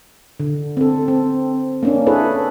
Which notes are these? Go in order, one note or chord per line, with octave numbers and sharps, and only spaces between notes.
D3
C4 A4
C4
A#3 C#4 D4
E4 G#4 A4 B4 C#5